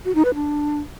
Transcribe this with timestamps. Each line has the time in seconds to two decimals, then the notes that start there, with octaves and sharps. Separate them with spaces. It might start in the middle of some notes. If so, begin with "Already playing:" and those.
0.05 F#4
0.15 D#4
0.25 B4
0.35 D4